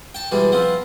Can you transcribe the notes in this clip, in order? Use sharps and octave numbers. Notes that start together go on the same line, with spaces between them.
G5 A5
B2 E3 G3 G#3
F3 B3 C4